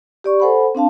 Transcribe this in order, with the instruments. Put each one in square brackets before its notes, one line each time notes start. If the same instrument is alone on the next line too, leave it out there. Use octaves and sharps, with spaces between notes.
[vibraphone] G4 D5 C#6
A4 C5 F#5 G#5 B5
C4 D4 F5 A5